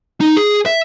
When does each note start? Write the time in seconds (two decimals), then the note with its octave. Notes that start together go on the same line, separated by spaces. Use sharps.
0.20 D#4
0.37 G#4
0.66 E5